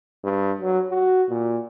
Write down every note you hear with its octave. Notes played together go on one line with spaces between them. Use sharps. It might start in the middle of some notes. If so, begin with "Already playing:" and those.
G2
F#3
F#4
A#2